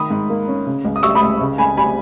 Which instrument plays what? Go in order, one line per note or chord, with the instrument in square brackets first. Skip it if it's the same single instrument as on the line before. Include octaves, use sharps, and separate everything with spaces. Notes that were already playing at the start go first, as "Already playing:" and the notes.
Already playing: [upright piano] D#3 B5 D#6
G#2
A#3
C#4
C#3
C#2
D#6
G3 C#6 E6
B5 D#6
C#2
C#3
C#2 G#5 B5
G3 G#5 B5